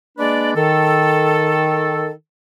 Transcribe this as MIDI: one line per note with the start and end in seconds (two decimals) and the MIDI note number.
0.18 0.50 56
0.18 0.50 58
0.18 0.50 62
0.18 0.50 71
0.18 0.50 74
0.55 2.10 51
0.55 2.10 69